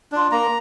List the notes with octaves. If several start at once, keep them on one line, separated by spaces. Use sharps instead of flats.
D4 F4
A#3 A#5